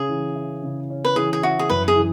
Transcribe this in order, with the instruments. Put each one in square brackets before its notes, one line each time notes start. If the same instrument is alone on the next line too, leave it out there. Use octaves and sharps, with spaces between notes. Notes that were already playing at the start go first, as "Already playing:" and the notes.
Already playing: [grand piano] C#3 C#4 [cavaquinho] G#4
[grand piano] E3
E4
C#3
C#4
[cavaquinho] B4
[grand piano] E3 [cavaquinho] G#4
[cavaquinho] G#4
[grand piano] E4 [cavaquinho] F#4
[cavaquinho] G#4
[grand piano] F#2 [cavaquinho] B4
[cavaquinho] G#4
[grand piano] E3